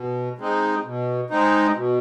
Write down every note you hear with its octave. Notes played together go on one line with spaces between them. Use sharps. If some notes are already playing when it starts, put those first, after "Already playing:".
Already playing: B2
G#3 C4 D#4
B2
G#3 C4 D#4
B2